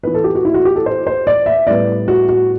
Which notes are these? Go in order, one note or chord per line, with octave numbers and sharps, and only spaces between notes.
E3 B3 B4
A4
G4
F#4
E4
F#4
G4
A4
C5
C5
D5
E5
A2 G3 B3 D5
F#4
F#4